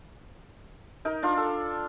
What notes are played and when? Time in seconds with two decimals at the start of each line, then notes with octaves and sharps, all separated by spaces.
1.05 D#4 A#4
1.23 D4 F4
1.37 A4